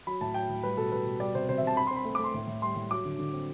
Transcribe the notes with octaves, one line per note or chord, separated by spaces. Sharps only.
F#3 B5
A2 A5
F#3 G5
A2
G3 B4
B2 A4
B2 B4
B2
G3 D5
C3 C5
C3 C5
E5
C3
A5
C4 B5
C6
C4
B5
A3
D6
A3
C6
A2
A2
G3 C6
A2
F#3 D6
D3
D3
C4